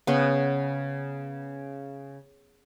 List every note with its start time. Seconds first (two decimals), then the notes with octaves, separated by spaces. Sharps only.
0.07 C#3 B3